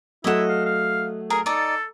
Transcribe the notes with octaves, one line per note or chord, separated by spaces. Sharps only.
F#3 A3 E4 D#5 F#5 E7
F5
F5
G#4 A#4
D#4 A4 D5